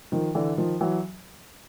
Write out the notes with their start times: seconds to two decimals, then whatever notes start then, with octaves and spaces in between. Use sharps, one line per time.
0.12 D#3 F3
0.35 D3 E3
0.57 D#3 F3
0.81 E3 F#3